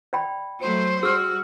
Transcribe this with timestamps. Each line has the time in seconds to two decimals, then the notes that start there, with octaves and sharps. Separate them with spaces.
0.13 D5 G5 B5
0.61 F#3 A3 C5
1.03 G3 F#4 G#4 E6 F6